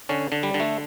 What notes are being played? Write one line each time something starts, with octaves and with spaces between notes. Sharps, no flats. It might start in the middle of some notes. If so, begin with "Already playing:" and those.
D3 C#4
D3
G3
D3
A3